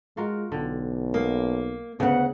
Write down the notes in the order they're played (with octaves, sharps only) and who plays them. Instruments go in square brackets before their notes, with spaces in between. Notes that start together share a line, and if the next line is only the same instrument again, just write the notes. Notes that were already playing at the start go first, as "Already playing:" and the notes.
[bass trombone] G#3 [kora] F4 F#4 A#4
[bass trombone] B1 [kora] D3 G5
[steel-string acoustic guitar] A#3 [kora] D#5
[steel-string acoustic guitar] D2 F#5 [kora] C#3 [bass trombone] B3